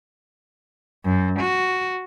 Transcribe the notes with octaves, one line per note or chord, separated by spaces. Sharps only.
F#2
F#4